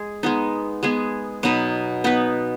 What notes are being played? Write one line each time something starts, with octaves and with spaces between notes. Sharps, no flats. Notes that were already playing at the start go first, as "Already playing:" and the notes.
Already playing: G#3 G#4
G#3 B3 D#4
G#3 B3 G#4
B2 F#3 D#4 B4
B3 D#4 B4